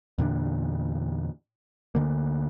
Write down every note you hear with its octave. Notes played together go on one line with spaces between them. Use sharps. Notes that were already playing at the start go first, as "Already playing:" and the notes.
E2 A#2 D3 D4
D2 D3 A#3